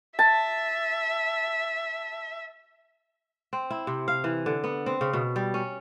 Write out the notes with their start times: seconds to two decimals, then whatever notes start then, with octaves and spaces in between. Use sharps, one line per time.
0.19 E5 A5
3.53 C4
3.70 E4
3.87 C3
4.08 F5
4.24 E3
4.46 D3
4.64 B3
4.86 C4
5.01 C#3
5.13 B2
5.36 G3
5.54 C#4